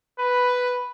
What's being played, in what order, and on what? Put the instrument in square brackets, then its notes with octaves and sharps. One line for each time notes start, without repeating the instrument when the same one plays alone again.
[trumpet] B4